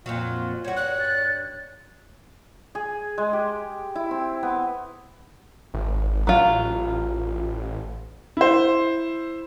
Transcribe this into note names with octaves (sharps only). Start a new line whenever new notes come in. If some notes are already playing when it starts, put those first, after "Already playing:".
F2 A#2 F#3 F4
G2 F#4 C#5
D5 F#6
A6
G#4
G#3
G4
E4
C4
B3
G#1
A1 F#3 F4
E4 C5